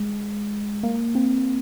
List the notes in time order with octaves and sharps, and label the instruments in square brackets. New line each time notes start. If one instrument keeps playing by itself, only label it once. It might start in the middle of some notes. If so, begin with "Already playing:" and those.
Already playing: [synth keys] G#3
A#3
C4